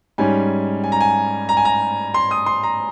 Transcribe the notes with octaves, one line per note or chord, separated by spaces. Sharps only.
G#2 G3 C#4 G#5
G#5
A#5
G#5
A#5
G#5
A#5
C6
D#6
C6
A#5